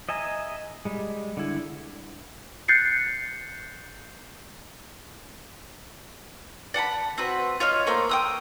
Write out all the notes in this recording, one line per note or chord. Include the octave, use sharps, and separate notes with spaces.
D#5 E5 G#5 A#5
G3 G#3
D3 E4
F#6 G6 A6 C7 C#7
D5 F#5 A5 B5
C4 F#4 B4
F4 C#5 D#5 F6
A3 A#3 C5
G5 D#6 E6